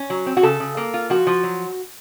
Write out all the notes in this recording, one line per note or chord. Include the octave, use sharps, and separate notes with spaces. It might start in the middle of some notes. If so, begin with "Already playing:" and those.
Already playing: C#4
F#3
C4
F#4
C#3 A4
C#3
A#3
F4
F3 F#4
F3
F#3